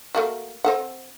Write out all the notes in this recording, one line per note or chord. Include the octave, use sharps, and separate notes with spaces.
A3 A#3 F#4
C4 A4 F#5